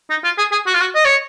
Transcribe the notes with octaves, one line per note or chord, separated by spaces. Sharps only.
D#4
F4
G#4
G#4
F#4
F4
F#4
D#5
C#5